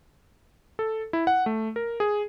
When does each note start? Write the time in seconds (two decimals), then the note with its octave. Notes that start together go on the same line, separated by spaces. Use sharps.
0.79 A4
1.13 E4
1.27 F#5
1.46 A3
1.76 A#4
2.00 G#4